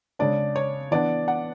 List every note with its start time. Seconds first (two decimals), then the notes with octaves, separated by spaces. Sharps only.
0.19 C#3 G#3 D4 D5
0.56 C#5
0.91 E3 B3 D4 D5
1.28 F#5